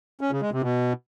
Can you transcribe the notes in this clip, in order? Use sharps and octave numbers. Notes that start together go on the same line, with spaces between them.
C#4
C#3
G#3
C3
B2